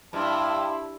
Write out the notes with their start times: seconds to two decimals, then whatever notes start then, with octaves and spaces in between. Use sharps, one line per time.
0.13 G2 E4 E5 A5 C6